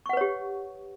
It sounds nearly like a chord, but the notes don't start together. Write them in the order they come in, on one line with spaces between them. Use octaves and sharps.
C#6 F#5 B4 C#5 G4